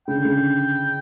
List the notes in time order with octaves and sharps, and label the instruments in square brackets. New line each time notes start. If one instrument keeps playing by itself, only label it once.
[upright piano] C#3 [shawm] G5
[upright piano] D3
C#3
D3